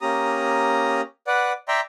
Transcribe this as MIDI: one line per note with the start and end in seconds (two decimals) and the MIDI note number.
0.01 1.01 58
0.01 1.01 61
0.01 1.01 67
0.01 1.01 82
0.01 1.01 87
1.27 1.53 71
1.27 1.53 74
1.27 1.53 78
1.68 1.81 74
1.68 1.81 76
1.68 1.81 79
1.68 1.81 82
1.68 1.81 84